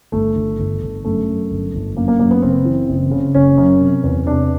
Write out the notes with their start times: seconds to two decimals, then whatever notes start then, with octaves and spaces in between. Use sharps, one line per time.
0.12 G1 A3
0.35 G1
0.59 G1
0.81 G1
1.04 F#2 A3
1.27 F#2
1.51 G1
1.74 G1
1.96 F#2 A#3
2.08 A#3
2.19 F#2 A#3
2.31 B3
2.42 F#1 C4
2.65 E3
2.89 F#1
3.11 C#3
3.35 F#1 C#4
3.58 F#2
3.80 C3
4.04 E2
4.26 C3 D4